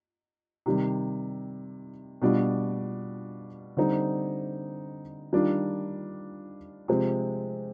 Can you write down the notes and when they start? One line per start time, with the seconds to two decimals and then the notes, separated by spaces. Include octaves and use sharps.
0.66 C3 D#3 G3
2.22 B2 G3 D4 F4
3.77 D3 G3 C4 D#4
5.33 D#3 G3 D4 F4
6.88 C3 F3 G#3 C4